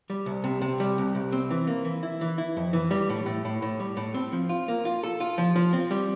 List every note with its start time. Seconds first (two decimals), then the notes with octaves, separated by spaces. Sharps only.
0.10 G3
0.26 C2
0.44 C3
0.61 C3
0.80 G3
0.98 C2
1.15 C2
1.33 C4
1.50 E3
1.67 A#3
1.85 E3
2.03 E4
2.21 E3
2.38 E4
2.57 F2
2.73 E3
2.91 G3
3.09 A2
3.26 A2
3.45 A2
3.62 A2
3.80 G3
3.97 A2
4.14 C4
4.32 F3
4.49 F4
4.68 A#3
4.85 F4
5.03 A4
5.20 F4
5.38 F3
5.56 F3
5.73 C4
5.91 G3